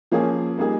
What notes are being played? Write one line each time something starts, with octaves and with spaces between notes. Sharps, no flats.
F3 A#3 C#4 G#4
G3 A#3 D#4 G#4